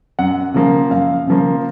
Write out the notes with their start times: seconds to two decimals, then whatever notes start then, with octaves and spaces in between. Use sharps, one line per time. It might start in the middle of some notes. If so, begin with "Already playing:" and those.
0.19 F#2 F#5
0.54 C#3 F3 A#3
0.90 F#2 F5
1.27 C#3 F3 A#3